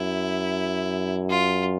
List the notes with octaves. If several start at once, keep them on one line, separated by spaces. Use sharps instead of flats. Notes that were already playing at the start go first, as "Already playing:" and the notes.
Already playing: F#2 E4
F4